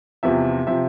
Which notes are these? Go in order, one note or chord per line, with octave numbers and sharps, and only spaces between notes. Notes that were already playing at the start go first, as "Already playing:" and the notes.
E2 C3 F3 E5
C3 F3 E5